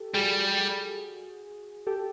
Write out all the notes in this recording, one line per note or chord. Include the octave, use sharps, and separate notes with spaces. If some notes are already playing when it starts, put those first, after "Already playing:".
Already playing: G4 A4
G3 F#4 G#4
G4 A4